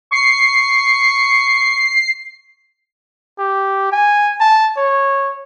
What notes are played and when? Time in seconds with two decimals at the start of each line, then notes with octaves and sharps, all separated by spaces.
0.12 C#6 C7
3.39 G4
3.92 G#5
4.40 A5
4.77 C#5